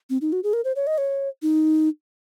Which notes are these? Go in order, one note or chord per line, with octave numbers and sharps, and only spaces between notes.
C4
D#4
F#4
G#4
A#4
C5
C#5
D#5
C#5
D#4